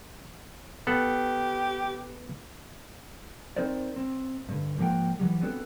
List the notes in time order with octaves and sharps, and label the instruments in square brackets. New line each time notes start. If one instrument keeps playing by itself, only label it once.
[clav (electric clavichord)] B3 A4 F#5 [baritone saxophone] G4
[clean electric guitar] C4 D#4 A#4 C5 D5
C4
G2 D3
G#2 F3 A#3 G#4 F#5 G5
E3 F#3 G3
B3 C4 D4 F#4 A4